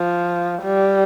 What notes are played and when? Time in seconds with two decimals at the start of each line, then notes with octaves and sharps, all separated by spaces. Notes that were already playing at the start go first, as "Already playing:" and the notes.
Already playing: F3
0.63 G3